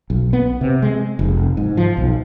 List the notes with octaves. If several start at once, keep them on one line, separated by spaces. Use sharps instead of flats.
B1
B3
C3
G#3
F1
G#2
F3
B1